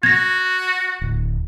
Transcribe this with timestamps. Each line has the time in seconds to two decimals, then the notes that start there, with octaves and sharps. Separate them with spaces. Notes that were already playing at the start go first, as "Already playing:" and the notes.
0.03 F#4 G#6 A#6
1.01 D1